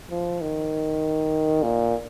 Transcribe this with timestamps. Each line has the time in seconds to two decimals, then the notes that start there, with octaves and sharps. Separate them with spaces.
0.10 F3
0.41 D#3
1.63 A#2